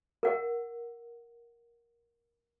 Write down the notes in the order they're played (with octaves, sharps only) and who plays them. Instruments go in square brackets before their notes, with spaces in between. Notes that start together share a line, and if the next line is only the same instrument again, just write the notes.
[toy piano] A#4 F#5